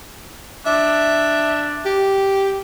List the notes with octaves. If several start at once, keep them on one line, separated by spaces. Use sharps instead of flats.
D4 E5
G4